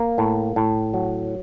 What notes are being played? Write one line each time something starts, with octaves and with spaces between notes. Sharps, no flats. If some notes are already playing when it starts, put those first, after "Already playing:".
Already playing: A#3
A2
A2
F#3